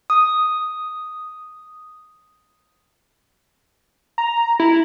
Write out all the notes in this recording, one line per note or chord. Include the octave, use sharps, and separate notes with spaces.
D#6
A#5
E4